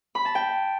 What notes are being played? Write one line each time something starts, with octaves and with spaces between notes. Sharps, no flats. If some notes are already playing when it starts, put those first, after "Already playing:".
B5
A5
G5